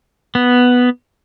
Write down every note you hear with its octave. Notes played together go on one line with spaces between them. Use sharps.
B3